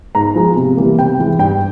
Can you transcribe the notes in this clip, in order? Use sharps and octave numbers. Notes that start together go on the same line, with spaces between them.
G#2 A#5
F3 G#3
C3
E3 G3 A#3
C3 G5
E3 G#3
G2 G5